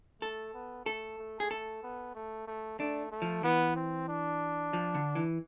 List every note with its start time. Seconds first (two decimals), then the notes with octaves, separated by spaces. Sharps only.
0.21 A3 A4
0.54 B3
0.85 A3 A4
1.18 A3
1.40 G#4
1.51 A3 A4
1.83 B3
2.15 A3
2.47 A3
2.79 A3 D4
3.12 A3
3.22 F3
3.43 E3 B3
3.76 C4
4.08 D4
4.73 F3
4.95 D3
5.15 E3